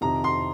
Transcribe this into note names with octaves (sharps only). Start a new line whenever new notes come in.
F2 C3 D#3 A#5
C6